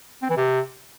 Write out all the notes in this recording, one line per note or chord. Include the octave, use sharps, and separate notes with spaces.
C4
E3
C3